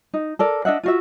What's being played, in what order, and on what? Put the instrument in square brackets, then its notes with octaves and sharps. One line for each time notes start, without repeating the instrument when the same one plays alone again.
[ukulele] D#4
A4 A#4 D5
D4 D#5 E5 F#5
F4 F#4 E5